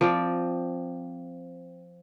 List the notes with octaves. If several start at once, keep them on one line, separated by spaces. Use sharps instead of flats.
F3 C4 D5